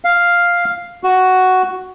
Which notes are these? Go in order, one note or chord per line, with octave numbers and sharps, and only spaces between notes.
F5
F#4